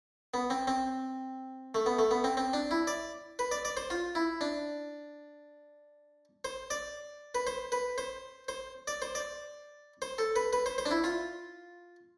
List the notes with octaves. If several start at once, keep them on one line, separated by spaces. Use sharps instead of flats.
B3
C4
C4
A3
B3
A3
B3
C4
C4
D4
E4
D5
B4
D5
D5
C5
F4
E4
D4
C5
D5
B4
C5
B4
C5
C5
D5
C5
D5
C5
A4
B4
B4
C5
C5
D4
E4
F4